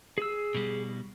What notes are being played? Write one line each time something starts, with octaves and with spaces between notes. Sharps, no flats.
G#4 E6
B2 G3